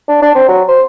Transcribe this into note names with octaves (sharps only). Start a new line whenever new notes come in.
D4
D4
C4
F#3
C5